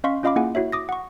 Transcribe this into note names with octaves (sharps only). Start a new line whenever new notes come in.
C#4 D#5 F5 C6 C#6 B6
C#4 F4 D#5 F5 B5 D6
A#3 E4 F4 G#4 F#5 G#5
E4 F#4 C#5 E5
D6 D#6 A#6
F#5 C#6